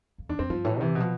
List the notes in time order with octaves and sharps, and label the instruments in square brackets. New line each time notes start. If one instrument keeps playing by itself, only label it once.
[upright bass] F2
[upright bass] E2 [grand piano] D4
[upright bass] F2 [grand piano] C4
[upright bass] G2 [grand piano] F3
[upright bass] A2 [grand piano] E3
[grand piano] C3 [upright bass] E3
[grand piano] B2
[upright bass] F3